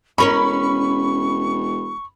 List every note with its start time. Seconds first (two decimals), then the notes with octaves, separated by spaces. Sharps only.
0.18 E1 C#4 A#4 C#5 B5 C#6